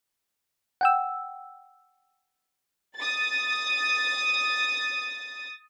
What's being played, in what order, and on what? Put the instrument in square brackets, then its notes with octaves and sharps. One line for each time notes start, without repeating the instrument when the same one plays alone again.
[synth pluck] F#5 G5 E6
[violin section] D#6 A6